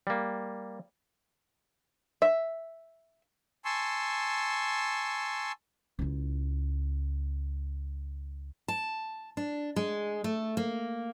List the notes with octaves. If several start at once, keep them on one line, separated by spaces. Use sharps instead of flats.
G3 A#3
E5
G#5 A5 C6 C#6 E6
C#2 E4
A5
D4
G#3
A3
A#3